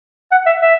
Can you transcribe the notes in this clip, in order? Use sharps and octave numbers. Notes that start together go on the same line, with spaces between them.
F#5
E5
E5